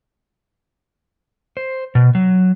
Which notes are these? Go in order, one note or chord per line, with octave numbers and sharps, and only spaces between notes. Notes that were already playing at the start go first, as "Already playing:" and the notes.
C5
B2
F#3